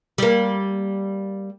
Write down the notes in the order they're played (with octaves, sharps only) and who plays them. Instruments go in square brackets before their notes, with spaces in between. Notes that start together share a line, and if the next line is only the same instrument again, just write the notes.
[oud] G3 A#3